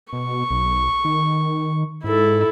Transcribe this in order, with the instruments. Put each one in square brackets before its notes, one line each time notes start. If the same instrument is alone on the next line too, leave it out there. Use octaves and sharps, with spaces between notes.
[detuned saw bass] B2 [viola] C#6
[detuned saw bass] B1
D#3
[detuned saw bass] G#2 [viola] E4 A4